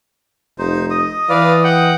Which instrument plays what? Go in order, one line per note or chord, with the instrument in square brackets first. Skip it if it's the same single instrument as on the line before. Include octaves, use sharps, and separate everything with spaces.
[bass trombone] F1 [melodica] D#4 C5
[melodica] D#5 D#6
[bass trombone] E3 [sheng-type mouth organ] B4 D5 F5
[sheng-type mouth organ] F#5 G5